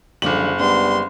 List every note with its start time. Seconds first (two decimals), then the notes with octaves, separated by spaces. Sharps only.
0.22 F#1 D3 F3 G3 F#7
0.59 G3 B3 D4 C6